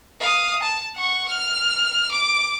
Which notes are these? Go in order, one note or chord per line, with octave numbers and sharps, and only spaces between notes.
F5 D#6
A5
F#5 C#6
F6
D6